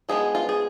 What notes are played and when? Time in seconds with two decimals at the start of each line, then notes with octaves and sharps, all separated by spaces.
0.09 F3 G#3 B3 G#4
0.35 F4
0.49 G#4